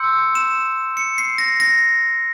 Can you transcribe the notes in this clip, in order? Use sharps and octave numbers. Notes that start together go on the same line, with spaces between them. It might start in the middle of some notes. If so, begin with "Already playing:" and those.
Already playing: C6 E6 G6 C#7
E7
C#7
C7
A#6
A#6